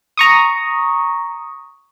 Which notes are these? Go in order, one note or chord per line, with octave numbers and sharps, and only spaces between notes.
A#5 C#6 D#6